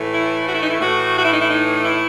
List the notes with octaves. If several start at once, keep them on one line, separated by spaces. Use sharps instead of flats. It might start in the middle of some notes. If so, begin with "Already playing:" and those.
Already playing: A2 E3 A3
E4
F#4
E4
D#4
E4
A2 E3 A3 F#4
F#4
E4
D#4
E4
D#4
E4